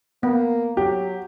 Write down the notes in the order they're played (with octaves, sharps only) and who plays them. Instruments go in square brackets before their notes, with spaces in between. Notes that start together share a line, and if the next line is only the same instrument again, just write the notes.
[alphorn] A#3 [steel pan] B3
[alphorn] F#3 [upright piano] G4